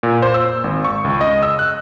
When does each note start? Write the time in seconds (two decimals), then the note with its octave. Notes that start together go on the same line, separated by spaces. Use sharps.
0.03 A#2
0.22 C5
0.34 E6
0.64 G#1
0.85 C#6
1.05 C#2
1.21 D#5
1.43 E6
1.59 F#6